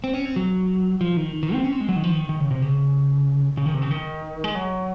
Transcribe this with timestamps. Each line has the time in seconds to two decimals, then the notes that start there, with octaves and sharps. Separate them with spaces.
0.04 C4
0.14 C#4
0.25 C4
0.36 F#3
1.01 F3
1.17 D#3
1.43 D#3
1.53 C4
1.64 C#4
1.72 C4
1.81 G#3
1.89 F#3
1.96 D#3
2.04 F3
2.12 D#3
2.29 D#3
2.40 C#3
2.51 C3
2.62 C#3
3.57 C#3
3.66 D#3
3.74 C3
3.82 C#3
3.91 D#3
4.44 G#3
4.55 F#3